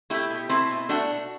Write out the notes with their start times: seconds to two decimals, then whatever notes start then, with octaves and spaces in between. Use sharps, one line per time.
0.10 A3 E4 G4
0.30 B2
0.49 A3 C4 E4
0.70 B2
0.89 A3 D4 F#4